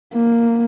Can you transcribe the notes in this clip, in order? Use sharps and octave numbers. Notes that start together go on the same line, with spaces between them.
A#3